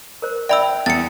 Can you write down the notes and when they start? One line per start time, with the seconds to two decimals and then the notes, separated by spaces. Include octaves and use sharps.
0.22 A#4 C5
0.49 D5 E5 G5 B5 E6
0.86 E2 A6 C#7